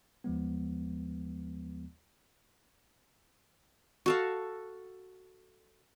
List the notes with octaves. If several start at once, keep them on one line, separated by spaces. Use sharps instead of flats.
D#2 F3 G#3 B3
F#4 A4 F5